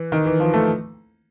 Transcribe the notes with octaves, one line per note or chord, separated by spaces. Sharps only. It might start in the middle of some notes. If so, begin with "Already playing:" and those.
Already playing: E3
D#3
E3
F3
A3